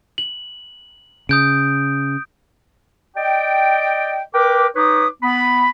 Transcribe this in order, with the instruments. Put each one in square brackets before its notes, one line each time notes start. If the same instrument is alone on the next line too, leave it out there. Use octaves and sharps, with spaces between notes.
[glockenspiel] F#7
[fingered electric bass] C#3 [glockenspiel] D#6 G6 D7
[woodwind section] D5 D#5 G5
A#4 B4 G5 D6
D#4 B4 C#5 D6 D#6
B3 B5